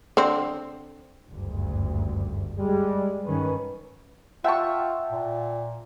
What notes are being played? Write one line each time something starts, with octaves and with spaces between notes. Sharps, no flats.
D3 C4
F#1 D2 G2
G3 G#3
G2 D#3 C#4 B4
F4 E5 F#5 G5 A5 C#6
A#2